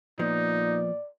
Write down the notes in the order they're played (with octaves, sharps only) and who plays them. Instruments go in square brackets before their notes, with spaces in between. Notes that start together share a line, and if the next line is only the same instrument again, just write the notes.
[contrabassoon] A#2 [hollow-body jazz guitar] F3 B3 [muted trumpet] D#4 [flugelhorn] D5